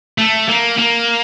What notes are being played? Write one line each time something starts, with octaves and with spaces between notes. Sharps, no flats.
A3
A#3
A#3